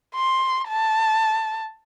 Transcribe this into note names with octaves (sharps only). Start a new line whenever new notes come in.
C6
A5